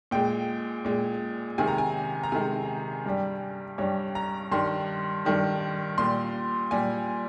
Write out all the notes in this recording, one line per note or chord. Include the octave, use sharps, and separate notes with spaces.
A#2 G#3 G5
A#2 G#3
C3 D#3 G#3 G#5
A#5
G#5
A#5
C3 D#3 G#3 G#5
G2 G3
G2 G3 C#5
A#5
G2 D#3 G3 C6
G2 D#3 G3
A#2 G3 C6
A#2 G3 G#5